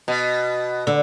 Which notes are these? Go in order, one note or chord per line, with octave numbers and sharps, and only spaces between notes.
B2
D3